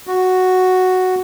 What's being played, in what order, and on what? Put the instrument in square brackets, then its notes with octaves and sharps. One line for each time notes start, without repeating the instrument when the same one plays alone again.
[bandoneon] F#4